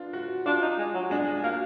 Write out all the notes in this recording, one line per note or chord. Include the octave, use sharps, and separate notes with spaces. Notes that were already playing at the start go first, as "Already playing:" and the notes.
Already playing: B3 D4 F4
F#4
D4 F4
D#4
G#3
F#3
G#3 D4
G#3
A#3 F#4